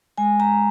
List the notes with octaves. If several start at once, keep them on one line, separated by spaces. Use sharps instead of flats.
G#3 G#5
A#5